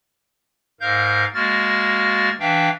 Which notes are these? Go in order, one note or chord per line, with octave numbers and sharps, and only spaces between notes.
G#2 A#4 F5 G6
G#3 A#3 F#4 F6 A6
E3 D4 E5 F5 G5